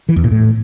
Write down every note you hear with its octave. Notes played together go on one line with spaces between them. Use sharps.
E3
E2
A#2
A2